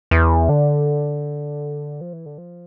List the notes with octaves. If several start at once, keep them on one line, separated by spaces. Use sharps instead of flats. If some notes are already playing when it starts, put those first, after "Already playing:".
E2
D3
F3
E3
D3
F3